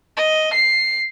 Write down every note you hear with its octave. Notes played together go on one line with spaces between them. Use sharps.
D#5
C7